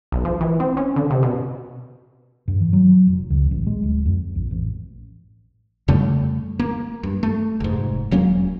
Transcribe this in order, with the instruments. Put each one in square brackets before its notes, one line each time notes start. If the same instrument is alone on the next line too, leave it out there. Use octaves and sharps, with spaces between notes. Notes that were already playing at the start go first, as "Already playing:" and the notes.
[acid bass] B1
F3
E3
C4
C#4
D3
C3
B2
[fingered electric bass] G2
E3
F#3
F1
C#2
A1
G#3
D1
F2
A#1
A1
[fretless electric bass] F2 C#3 G3 A3
A#3
G2
A3
F1 G#2
E1 F#3 A#3 C#4